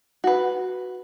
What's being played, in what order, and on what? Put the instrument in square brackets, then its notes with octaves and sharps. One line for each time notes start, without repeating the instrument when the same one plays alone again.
[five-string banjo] F#4 B4